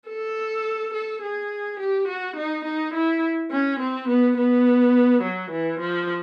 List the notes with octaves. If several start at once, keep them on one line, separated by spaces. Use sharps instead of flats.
A4
A4
G#4
G4
F#4
D#4
D#4
E4
C#4
C4
B3
B3
F#3
E3
F3